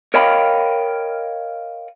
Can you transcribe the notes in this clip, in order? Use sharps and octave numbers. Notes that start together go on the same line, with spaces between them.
A#4 C#5 D#5 F5 G5 B5